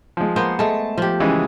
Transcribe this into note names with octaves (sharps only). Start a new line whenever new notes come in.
F3 G#3
A#3 B3 C5
G#3 A3 A5
F3 G4
C#3 E3 G#3